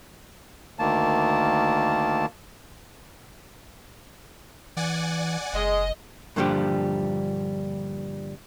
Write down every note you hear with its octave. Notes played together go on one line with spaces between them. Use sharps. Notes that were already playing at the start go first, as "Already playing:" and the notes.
D2 D#3 A#3 A5
E3 D5 F#5 G#5
F#1 G#3 D#5
G2 A#2 D3 F3 G3 G4